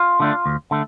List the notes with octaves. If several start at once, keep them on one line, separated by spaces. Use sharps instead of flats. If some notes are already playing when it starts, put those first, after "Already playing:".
Already playing: F4
D3 A3 D4
D2
D3 A3